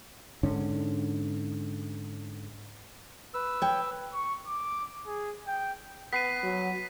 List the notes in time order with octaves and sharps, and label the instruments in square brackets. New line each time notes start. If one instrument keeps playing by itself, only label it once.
[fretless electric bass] G#2 D3 C#4
[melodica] B4 E6
[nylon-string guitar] C#5 G5
[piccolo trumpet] C#6
D6
G#4
G5
[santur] B3 [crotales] B6 C7 D#7
[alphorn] F#3